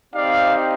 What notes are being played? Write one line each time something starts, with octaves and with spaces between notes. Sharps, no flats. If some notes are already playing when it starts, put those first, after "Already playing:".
C4 D#4 G4 D5 F5